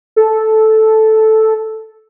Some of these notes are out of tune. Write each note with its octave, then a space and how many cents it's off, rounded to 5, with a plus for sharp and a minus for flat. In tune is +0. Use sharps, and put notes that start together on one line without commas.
A4 -5